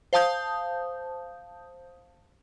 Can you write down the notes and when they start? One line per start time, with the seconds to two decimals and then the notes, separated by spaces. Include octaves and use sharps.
0.13 C5 F5 A5 D#6 G6